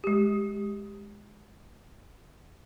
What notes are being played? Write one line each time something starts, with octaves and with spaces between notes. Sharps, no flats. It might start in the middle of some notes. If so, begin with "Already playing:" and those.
G#3 G4